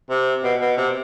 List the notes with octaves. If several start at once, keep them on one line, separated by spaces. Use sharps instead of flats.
C3
B2
B2
C3